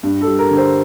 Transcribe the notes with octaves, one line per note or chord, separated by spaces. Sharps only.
G2
A4
G3
A#4
D3
C5